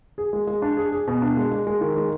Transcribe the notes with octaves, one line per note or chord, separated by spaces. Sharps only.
G#4
G#3
G#3
D4
G#4
G#4
B2
D4
G#3
G#3
G#3
D#3
G#3